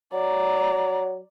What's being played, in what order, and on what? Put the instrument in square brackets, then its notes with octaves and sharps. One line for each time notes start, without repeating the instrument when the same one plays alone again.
[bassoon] F#3 [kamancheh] D5 A#5